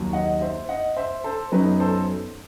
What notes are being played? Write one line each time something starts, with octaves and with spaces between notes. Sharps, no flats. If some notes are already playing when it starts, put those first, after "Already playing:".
Already playing: D#2 D#3 F#3
D#5 F#5
C5 E5
D#5 F#5
C5 E5
A4 C5
F#2 F#3 B3 D#4 B4
A4 C5